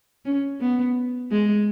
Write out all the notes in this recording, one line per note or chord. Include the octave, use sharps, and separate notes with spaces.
C#4
B3
G#3